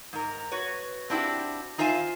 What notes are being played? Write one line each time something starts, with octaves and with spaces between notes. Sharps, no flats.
G#2 A#4
F#4 B4 C#5
C4 D4 E4 F#4 G4
D#4 F4 C5 E5 G#5